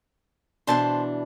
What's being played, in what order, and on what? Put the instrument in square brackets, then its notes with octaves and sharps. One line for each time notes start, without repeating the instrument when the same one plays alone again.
[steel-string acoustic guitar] B2 E3 D4 [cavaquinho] C5 A5 C6